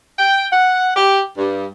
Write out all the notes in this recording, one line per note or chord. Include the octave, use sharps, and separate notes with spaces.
G5
F#5
G4
G2